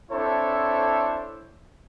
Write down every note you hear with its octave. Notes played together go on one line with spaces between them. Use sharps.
C4 D4 E4 A4 C5 C#5